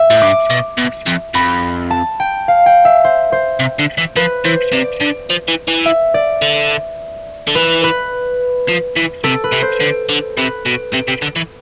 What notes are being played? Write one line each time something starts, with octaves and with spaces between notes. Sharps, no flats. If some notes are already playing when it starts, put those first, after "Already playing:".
Already playing: E5
A2
G2 D6
B2
B2
F2
F2 B5
A5
G5
F5
G5
E5
C5
C5
C3
D3
E3
F3 B4
E3 C5
C3 D5
D3
F3
E3
E3
E5
D5
D3
D3
E3 B4
B4
F3
E3
C3 A4
B4
C3
C5
D3
D3
C3 B4
B2
C3
C3
D3
E3